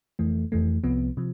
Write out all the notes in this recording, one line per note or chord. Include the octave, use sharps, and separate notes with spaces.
F2 E3 A3
F2 E3 A3
C2 C3 F3 B3
C3 F3